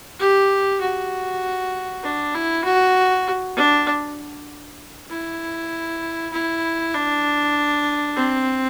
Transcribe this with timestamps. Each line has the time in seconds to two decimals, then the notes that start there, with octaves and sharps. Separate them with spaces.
0.20 G4
0.81 F#4
2.03 D4
2.35 E4
2.65 F#4
3.56 D4
5.10 E4
6.33 E4
6.94 D4
8.16 C4